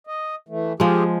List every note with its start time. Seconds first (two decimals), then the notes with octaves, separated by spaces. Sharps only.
0.07 D#5
0.49 E3 A3
0.80 F3 G#3 F4 G4 G#4